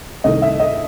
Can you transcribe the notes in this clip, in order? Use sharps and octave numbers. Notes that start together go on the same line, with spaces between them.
C2 C3 D#3 A3 D#5
E5
D#5